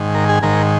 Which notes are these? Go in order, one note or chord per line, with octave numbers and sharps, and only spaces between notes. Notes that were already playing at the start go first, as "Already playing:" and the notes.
Already playing: G#2 D#3
A#4
G#4
G#2 D#3 A#4